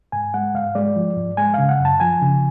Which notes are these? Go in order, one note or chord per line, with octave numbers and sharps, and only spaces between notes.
G#2 G#5
G#3 F#5
G#2 F5
G#3 D5
F3
G#2
G#3 G#5
C#3 F5
F#5
F#2
A5
F3 G#5
C#3